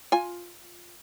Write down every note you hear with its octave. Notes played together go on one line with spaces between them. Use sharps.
F4 G#5